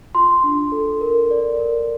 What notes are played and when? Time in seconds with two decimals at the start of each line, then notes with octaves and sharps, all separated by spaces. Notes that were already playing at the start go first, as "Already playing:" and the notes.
0.15 F4 C6
0.44 D4
0.72 A4
1.01 A#4
1.31 D5
1.59 A#4